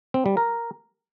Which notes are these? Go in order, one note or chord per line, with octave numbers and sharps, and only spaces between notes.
C4
G3
A#4